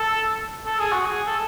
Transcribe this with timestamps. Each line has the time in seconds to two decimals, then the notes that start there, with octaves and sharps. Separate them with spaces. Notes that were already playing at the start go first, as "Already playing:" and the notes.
Already playing: A4
0.66 A4
0.79 G#4
0.92 F#4
1.05 G#4
1.27 A4